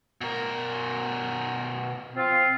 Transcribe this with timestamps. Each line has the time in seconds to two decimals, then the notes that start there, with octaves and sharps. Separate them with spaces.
0.21 B2 A#4
2.14 F3 C4 F4